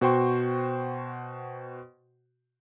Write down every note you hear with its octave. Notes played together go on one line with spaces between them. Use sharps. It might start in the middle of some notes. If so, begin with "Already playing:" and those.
B2 F#4 C5 G5 C6 C#6